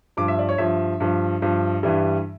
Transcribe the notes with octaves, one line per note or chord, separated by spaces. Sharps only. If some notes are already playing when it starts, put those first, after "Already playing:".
G2 F3 D6
E5
D5
C#5
G2 F3 E5
G2 F3
G2 F3
G2 E3 G3